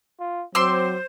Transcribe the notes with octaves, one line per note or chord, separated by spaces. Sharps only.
F4
F#3 C4 C5 C6 D6 E6